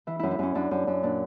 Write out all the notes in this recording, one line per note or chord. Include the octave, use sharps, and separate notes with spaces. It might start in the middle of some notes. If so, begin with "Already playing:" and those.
E3 E4
F#2 E4
E4
F#2 C#4
F#2 D4
F#2
F#2
A#2 D4